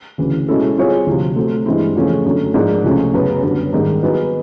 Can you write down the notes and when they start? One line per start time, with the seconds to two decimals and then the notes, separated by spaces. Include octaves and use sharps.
0.18 D2 C#3 E3
0.48 B2 G#3 C#4 E4 A4
0.77 G3 C4 F4 G#4 C#5
1.06 D2 C3 F3
1.36 F#3 A3 C4
1.66 G2 E3 G#3 C4 E4
1.95 E2 C#3 F3 A3 C#4
2.25 F#2 D3 F#3 A3
2.54 G#2 F3 A#3 D4
2.84 C#2 C3 F3 A3 C#4
3.14 F#2 C#3 F#3 B3
3.43 F#2 D3 G3 B3
3.73 G#2 D#3 G3 A#3
4.03 F#3 B3 D#4 G#4